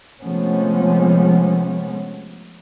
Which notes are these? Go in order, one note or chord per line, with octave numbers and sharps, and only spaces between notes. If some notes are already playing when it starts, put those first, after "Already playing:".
C3 F3 G#3 A3 B3 C#4